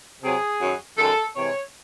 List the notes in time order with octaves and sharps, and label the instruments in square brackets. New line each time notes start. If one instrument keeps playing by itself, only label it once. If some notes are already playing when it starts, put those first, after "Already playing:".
[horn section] C3 F#3 G#4
F#2 D#3 F#3
F#2 D#3 G#3 A4
C3 E3 G#3 C#5